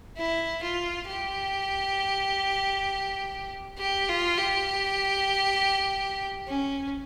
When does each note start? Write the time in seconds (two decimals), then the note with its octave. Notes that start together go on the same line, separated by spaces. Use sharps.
0.17 E4
0.63 F4
1.08 G4
3.78 G4
4.09 F4
4.38 G4
6.48 C#4